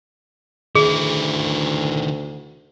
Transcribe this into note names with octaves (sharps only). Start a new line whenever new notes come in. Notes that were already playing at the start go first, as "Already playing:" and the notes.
D2 D#3 E4 G#4